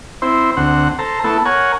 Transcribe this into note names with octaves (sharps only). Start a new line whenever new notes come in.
C4 E4 C5
D2 C4 F#5
A4 C5 A#5
A3 B3 E4 A4
A#4 C#5 F#5 G#5